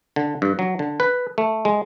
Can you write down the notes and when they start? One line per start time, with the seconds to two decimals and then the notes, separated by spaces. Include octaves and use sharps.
0.16 D3
0.42 G2
0.59 F#3
0.79 D3
1.00 B4
1.38 A3
1.65 G#3